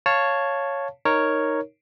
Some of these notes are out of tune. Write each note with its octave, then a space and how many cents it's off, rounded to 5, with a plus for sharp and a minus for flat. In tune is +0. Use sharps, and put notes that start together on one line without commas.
C#5 +0 F5 +0 A5 +0
D#4 +0 A#4 +0 C#5 +0